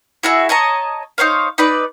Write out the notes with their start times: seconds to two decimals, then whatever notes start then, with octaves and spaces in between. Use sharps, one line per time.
0.23 E4 F#4 G#4 E5
0.49 C#5 D#5 A5 A#5
1.18 D#4 C5 C#5 F5
1.58 D#4 B4 D5